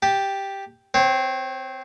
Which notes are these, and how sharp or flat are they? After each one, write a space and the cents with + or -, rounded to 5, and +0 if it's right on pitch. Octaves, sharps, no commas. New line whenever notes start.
G4 +0 A5 +0
C4 -15 C#5 -45